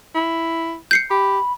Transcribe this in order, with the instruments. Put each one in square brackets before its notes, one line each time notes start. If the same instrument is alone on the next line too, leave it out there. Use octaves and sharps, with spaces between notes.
[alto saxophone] E4
[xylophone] G6 C7 C#7
[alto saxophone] G4 [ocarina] B5